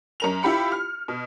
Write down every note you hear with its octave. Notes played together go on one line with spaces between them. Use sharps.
F#2 A#4 F7
E4 F4 G4 B5 C#7
F6
B2